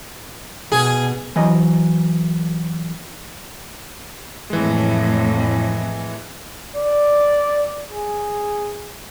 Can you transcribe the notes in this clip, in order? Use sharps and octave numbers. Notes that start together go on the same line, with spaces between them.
B2 G#4
E3 F#3 D#5
F2 A2 E3 G#3
D5
G#4